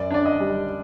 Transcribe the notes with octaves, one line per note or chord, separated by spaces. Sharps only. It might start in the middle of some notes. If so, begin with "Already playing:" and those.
Already playing: F#2 D5
D4 D5
D#5
G3